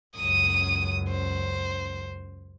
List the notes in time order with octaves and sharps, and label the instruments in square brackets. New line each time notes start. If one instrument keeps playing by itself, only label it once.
[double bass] C#2 F#2 [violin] D#6 D#7
[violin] C5